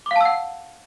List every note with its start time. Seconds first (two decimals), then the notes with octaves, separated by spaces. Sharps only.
0.06 D6
0.11 F5
0.16 A5
0.21 E6
0.25 F#5